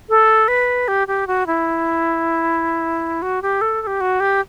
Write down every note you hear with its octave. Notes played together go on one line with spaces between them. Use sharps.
A4
B4
G4
G4
F#4
E4
F#4
G4
A4
A4
G4
F#4
G4